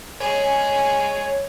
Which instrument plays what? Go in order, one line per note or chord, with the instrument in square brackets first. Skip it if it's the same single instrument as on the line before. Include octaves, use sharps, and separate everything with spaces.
[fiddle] G#3 G#4 [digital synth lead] C#5 [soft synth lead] G#5